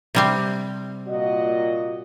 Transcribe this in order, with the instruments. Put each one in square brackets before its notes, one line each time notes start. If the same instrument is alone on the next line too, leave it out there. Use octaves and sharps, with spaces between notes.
[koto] C3 G3 C4
[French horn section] A#2 F#4 D#5